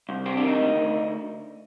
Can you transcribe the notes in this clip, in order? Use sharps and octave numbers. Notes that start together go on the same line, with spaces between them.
C2
C3 C4
D4
D#3 D#4
D2
D2